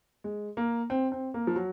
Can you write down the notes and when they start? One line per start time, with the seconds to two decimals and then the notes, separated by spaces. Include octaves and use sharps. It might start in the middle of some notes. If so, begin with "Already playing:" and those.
0.24 G#3
0.57 A#3
0.90 C4
1.12 C4
1.34 A#3
1.47 F3
1.56 F#3